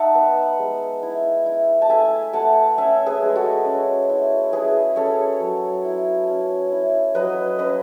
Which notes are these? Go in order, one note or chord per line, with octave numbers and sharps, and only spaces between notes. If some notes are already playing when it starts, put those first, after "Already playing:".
Already playing: D#4 E5 F#5 A5
B3
G#3
E4
E4
A5
A3 E5 G#5
A3 F#5 A5
C#4 E5 G#5
G#4 B4
G#3
F#4 A4
C#4
E4
E4 G#4 B4
C#4 A4 C#5
F#3
E4
C#4
E4
F#3 B4 D#5
C#4 B4 D#5